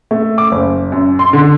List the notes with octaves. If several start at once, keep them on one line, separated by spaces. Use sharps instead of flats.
A3
D6
F#1
F#2
C6
D3